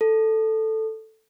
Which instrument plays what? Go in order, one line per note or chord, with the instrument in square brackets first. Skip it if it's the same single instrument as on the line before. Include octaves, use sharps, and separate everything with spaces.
[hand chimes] A4